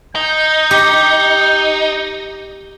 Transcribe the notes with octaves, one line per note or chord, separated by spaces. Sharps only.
D#4 G6
G4